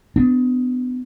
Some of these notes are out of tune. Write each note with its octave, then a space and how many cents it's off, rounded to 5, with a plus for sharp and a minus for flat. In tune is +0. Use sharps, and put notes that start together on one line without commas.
B3 +30 D4 +15